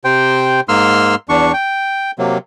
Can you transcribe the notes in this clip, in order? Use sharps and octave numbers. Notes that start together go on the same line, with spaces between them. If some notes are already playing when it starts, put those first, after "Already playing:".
C3 C5 G5
G#2 A#3 C6 E6 F6
E2 D4 C#6
G5
C3 F#3 A#3